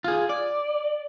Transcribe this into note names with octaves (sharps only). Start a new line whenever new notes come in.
F4 G#4
D5